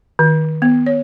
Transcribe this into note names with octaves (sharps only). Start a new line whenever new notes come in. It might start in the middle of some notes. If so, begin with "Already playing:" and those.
D#3
B3
C#5